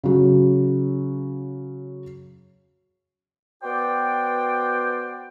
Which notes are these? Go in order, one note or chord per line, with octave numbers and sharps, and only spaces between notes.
C#3 F#3
B3 F#4 B4 C5 D5 G5